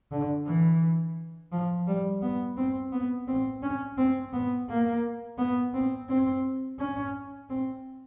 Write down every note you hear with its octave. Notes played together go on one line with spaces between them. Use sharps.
D3
E3
F3
G3
B3
C4
B3
C4
C#4
C4
B3
A#3
B3
C4
C4
C#4
C4